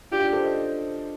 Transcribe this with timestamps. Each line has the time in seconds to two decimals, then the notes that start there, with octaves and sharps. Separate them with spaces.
0.11 D4 F4 G4
0.22 D4 F4
0.33 A4 C5
0.44 C5 D#5